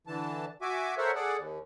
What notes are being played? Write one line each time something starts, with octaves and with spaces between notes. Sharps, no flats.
D3 E3 A5
F#4 E5 G#5 D6
A4 A#4 C5 C#5 E5 F#5
G#4 A4 D5 F#5
D#2